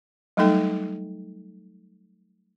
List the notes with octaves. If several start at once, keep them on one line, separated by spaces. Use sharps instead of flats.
F#3 G3 A3 D#4 A4 G5